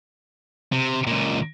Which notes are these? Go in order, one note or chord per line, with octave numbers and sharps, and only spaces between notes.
C3
C#2 A#2